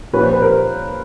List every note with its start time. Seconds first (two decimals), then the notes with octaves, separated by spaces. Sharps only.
0.13 A#2 F3 A#3 B4 C#5
0.23 C5 D5
0.33 B4
0.42 A#4 C5